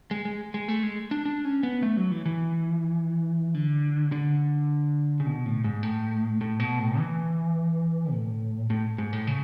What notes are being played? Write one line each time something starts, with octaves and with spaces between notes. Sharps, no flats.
G#3
G#3
G#3
A3
G#3
D4
D4
C#4
B3
A3
F#3
E3
E3
D3
D3
C#3
B2
A2
G#2
A2
A2
B2
A2
E3
A2
A2
G#2
A2
C#3